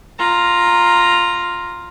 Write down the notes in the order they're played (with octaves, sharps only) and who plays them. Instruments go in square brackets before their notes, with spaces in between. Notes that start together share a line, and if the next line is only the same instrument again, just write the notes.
[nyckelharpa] F4 A#5